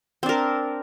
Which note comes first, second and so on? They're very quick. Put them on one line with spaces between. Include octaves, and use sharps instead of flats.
C4 D4 A#4